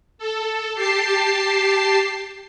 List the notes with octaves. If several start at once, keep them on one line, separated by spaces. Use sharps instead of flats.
A4
G4 A5 C7